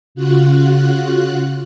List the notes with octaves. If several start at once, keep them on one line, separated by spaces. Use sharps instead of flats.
C#3 F4 F#4 F#6